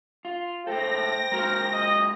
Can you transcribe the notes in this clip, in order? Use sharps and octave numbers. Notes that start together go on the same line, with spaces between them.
F4
G#2 A3 A4 C5 G5 A#6
G#3 A#3 F#4 A#4
D#5